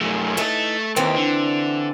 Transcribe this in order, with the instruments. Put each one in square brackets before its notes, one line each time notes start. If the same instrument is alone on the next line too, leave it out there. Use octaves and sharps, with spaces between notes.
[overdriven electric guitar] F#2 A3
[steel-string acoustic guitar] E3 D#4 [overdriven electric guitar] A3 A4
[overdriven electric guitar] D#2 [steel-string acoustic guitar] E3 C4
[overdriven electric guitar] D3